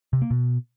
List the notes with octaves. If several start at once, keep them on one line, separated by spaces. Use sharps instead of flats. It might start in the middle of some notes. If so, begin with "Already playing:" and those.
C3
A#3
B2